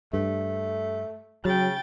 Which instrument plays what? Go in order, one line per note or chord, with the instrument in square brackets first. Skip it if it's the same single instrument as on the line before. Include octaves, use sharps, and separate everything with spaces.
[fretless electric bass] G2 [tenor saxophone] A3
[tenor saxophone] C#3 [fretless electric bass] F#3 [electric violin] G5 A6